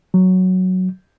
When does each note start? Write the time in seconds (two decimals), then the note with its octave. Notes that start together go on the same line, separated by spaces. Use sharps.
0.14 F#3